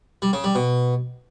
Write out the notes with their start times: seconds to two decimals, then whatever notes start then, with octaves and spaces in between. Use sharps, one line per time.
0.22 G3
0.33 C#3
0.44 G3
0.55 B2